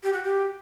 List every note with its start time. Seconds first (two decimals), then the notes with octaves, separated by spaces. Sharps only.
0.03 G4
0.13 F#4
0.23 G4